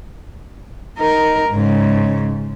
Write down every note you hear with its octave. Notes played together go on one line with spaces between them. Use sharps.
D#4 A#4
G#2 C#3